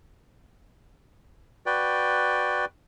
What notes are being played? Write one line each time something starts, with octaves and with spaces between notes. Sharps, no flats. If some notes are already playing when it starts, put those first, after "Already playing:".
F#4 B4 D5 G5